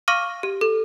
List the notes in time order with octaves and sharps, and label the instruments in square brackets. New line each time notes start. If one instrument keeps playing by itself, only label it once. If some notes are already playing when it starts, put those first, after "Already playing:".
[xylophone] F5 C#6 D6 F6 A#6 D#7
G4
A4